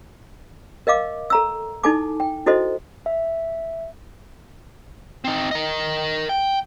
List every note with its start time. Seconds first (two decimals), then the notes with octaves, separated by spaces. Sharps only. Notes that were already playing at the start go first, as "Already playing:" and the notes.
0.87 A#4 D#5 F5 D6
1.30 A4 A#5 E6
1.83 D#4 E4 A4 G#5 A5 D6
2.20 G5
2.46 E4 F#4 A4 C5 D#5
3.06 E5
5.24 C4 D#4
5.51 A#4 D#5
6.29 G5